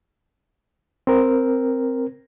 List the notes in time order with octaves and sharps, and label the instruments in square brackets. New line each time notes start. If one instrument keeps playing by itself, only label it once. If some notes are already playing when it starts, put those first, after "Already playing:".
[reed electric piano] C4 A#4